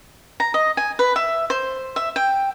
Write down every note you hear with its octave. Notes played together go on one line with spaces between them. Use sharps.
A#5
D#5
G#5
B4
E5
C5
E5
G5